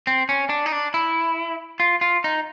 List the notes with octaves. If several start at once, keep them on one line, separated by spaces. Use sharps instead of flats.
C4
C#4
D4
D#4
D4
E4
F4
F4
D#4